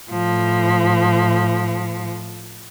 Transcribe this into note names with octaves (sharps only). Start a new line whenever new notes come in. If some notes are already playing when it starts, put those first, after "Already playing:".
A2 F3